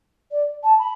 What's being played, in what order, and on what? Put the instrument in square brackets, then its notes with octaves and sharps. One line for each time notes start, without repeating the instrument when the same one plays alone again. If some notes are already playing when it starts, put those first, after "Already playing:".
[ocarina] D5
A5
B5